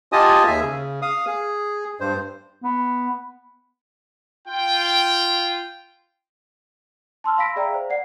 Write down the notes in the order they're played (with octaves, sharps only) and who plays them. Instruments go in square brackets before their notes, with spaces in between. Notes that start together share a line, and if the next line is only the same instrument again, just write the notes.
[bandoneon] F4 G4 D#5 G#5 A5 D#6
D#2 G#4 E5 G#5
C#3
F5 D#6
G#4
G2 C5
[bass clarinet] B3
[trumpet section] F4 G5
[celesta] A5 C6 E6 F6
F5 B5 E6 A#6 B6 D7
G#4 D5 E5 F5 G5 A#5
C5
D5 F#5 C7